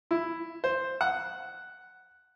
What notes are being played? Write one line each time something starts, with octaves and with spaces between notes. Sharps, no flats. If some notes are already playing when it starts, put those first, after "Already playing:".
E4
C5
F#5